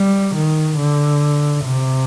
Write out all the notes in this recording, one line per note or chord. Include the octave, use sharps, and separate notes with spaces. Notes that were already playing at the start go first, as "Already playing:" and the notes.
Already playing: G3
D#3
D3
C3